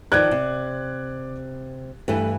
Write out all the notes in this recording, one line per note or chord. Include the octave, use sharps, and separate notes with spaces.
D#3 F3 D5 G5 F#6 G#6
C3
G2 E3 A3